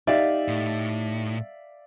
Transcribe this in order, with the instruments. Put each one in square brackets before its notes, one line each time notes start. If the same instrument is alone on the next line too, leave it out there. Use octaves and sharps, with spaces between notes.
[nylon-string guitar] D#4 G4 [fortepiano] D5 E5 F5
[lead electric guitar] A2